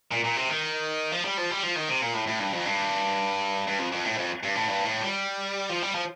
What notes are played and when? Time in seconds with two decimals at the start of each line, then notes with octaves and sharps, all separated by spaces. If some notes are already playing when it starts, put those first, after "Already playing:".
0.11 A#2
0.24 A#2
0.37 C3
0.49 D#3
1.12 F3
1.25 G3
1.38 F3
1.51 G3
1.63 F3
1.76 D#3
1.89 C3
2.02 A#2
2.14 A2
2.27 A2
2.40 G2
2.53 F2
2.65 G2
3.67 G2
3.79 F2
3.92 F2
4.05 A2
4.17 F2
4.43 G2
4.55 A2
4.68 G2
4.85 A2
5.02 G3
5.70 F3
5.83 G3
5.95 F3